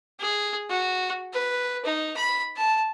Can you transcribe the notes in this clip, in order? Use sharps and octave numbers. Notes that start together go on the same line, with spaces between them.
G#4
F#4
B4
D#4
B5
A5